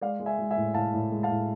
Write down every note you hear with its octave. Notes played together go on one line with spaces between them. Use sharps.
G#3 D5 F5
G#3
E5 G#5
G#3
E5 G#5
A2
A2 F5 A5
A2
G#3
F5 A5
A2